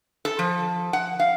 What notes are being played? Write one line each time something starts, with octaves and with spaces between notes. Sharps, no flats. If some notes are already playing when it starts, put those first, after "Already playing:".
A4
F3
F#5
F5